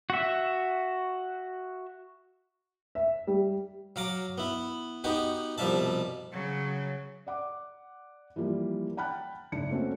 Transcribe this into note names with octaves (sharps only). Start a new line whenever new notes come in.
F#4 E5
E5
G3
F#3 F5 A#5 D6
B3 E4
B3 D#4 F#4 G4
C2 B2 F3 G3 E5 A5
C#3 F#3
D5 F#5 D6
E3 F3 G3 A#3
F#5 G5 A5 B5 F6 F#6
F#1 G#2 D4 C#7
A3 A#3 C4 C#4 F#4